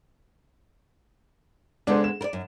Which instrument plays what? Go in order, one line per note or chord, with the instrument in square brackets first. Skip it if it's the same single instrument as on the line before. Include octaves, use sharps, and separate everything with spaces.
[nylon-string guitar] C#3 G#3 B3 [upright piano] D4 A4 C5
[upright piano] E7
[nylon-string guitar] A#4 D5
F#2